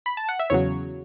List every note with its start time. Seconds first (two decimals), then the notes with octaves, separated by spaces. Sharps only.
0.06 B5
0.17 A5
0.29 F#5
0.39 E5
0.50 E2 C#3 F#3 C#5